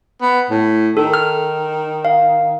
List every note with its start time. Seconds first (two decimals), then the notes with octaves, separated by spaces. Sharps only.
0.22 B3
0.50 A2
0.97 D#3 A4
1.14 F6
2.05 F5